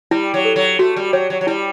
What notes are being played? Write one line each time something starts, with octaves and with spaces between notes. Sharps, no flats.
G3 E4
F#3
A4
F#3
A3 F#4
G3
F#3 C#5
F#3
F#3
G3 E4